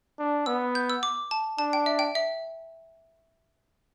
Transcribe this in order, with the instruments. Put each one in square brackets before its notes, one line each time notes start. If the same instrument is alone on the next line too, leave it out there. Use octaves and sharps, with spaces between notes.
[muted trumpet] D4
[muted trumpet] B3 [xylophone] E6
[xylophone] G6
E6
D6
A5
[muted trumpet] D4 [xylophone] A5
[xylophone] G5
E5
G5
E5